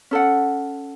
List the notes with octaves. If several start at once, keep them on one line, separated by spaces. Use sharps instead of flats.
C#4 A4 F#5